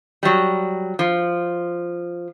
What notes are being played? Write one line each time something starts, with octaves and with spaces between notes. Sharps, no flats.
F#3 G3
F3